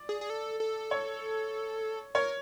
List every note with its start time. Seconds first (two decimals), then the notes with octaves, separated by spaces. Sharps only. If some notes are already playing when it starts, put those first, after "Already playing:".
Already playing: D5
0.09 G#4
0.21 G#4
0.30 A4
0.60 A4
0.91 C#5
2.15 A#4 C#5